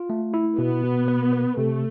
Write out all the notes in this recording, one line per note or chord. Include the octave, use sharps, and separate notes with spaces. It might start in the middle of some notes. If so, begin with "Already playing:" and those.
Already playing: F4
A3
E4
B2 B3
B2
B4
B4
C3 A3